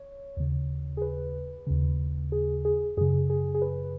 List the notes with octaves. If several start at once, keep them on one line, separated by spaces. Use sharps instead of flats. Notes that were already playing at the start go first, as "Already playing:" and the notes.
Already playing: C#5
D#2 C#3
G#4
B4
D#2 C#3
G#4
G#4
F#2 C#3 G#4
G#4
G#4
B4